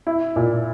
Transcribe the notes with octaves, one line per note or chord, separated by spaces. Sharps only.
E4
A#2